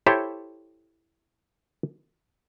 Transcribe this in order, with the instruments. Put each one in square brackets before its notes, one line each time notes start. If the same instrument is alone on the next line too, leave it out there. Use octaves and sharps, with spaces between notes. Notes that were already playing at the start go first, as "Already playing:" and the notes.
[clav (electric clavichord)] E4 G4 A4 C5 C#5 E5